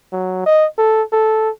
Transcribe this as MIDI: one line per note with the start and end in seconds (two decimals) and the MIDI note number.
0.12 0.44 54
0.46 0.66 75
0.78 1.02 69
1.12 1.50 69